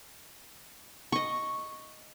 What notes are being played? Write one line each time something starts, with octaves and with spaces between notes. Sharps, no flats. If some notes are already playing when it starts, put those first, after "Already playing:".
D#5 C#6